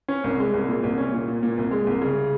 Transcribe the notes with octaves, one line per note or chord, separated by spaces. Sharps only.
C#4
C2
G#3
C2
A#2
C2
C#4
A#2
A#2
A#2
C2
G#3
C2
C#3